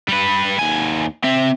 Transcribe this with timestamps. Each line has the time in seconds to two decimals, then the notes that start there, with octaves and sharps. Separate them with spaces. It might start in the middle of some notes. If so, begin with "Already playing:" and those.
0.08 G3 B4
0.59 D#2 G#5
1.24 C4 E5